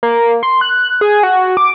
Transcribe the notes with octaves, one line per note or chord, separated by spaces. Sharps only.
A#3
C6
F#6
G#4
F#4
D6